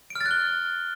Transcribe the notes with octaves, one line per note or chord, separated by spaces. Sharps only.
D7
F6
A6
F#6
G7